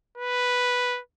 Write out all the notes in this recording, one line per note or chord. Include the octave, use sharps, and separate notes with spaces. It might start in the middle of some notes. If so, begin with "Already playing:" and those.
B4